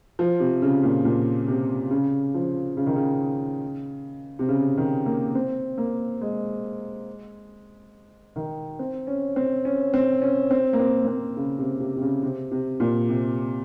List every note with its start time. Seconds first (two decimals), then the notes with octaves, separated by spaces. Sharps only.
0.19 F3
0.40 C3
0.62 C#3
0.83 A#2
1.05 A#2
1.48 C3
1.91 C#3
2.34 F3
2.77 C#3
2.87 D#3
2.96 C#3
4.39 C3
4.49 C#3
4.77 D#3
5.06 A#3
5.35 C4
5.78 A#3
6.21 G#3
8.36 D#3
8.79 C4
9.07 C#4
9.36 C4
9.65 C#4
9.94 C4
10.22 C#4
10.51 C4
10.73 A#3
10.80 C4
11.04 A#3
11.08 C4
11.37 C#3
11.58 C3
11.80 C3
11.97 C3
12.01 C#3
12.23 C3
12.51 C3
12.80 A#2
13.09 C3